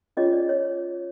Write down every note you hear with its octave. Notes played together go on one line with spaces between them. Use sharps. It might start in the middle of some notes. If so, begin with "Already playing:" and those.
C#4 F4 G#4 C#5 D#5
D5
C#5